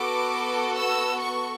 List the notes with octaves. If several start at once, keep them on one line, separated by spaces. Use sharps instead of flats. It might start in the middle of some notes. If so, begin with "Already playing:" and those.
Already playing: B3 F#4 A4 D6
E6
C#6